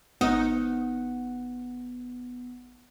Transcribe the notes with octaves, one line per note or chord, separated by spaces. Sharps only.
G#1 B3 D#4 F#5